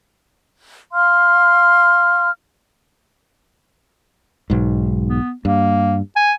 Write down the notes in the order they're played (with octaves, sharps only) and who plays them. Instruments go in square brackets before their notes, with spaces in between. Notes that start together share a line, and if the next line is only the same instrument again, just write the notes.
[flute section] F5 C6 F6
[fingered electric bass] B1 G#2
[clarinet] B3
[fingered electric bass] G2 [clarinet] A#3
[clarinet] G#5